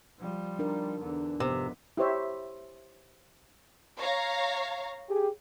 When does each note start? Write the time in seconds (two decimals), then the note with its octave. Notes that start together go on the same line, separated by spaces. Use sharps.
0.20 F3 G3
0.59 D4 D#4 A#4
1.00 E2 D3
1.40 G#1 F2 C3 B3
1.97 E4 G4 C5 C#5 E5
4.00 C#5 F5 A#5
5.09 G4 G#4